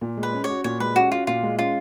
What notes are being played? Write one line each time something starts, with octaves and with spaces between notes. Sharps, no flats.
A#2
G#3
B4
C#4
C#5
F#4
A#2 C#5
G#3 B4
C#4 F#4
F4 F#4
A#2 F4
G#3
C#4 F4